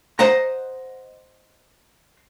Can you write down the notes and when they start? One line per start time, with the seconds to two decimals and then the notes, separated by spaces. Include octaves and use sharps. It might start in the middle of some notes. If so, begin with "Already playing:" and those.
0.19 C5 D#5 F#5 A#5